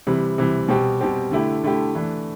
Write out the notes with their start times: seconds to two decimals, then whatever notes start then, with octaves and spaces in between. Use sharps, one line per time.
0.07 C3 E3 G3
0.38 C3 E3 G3
0.68 B2 G3 C4 G4
1.01 B2 G3 C4 G4
1.31 D3 A3 E4 G4
1.63 D3 A3 E4 G4
1.95 E3 A3 D4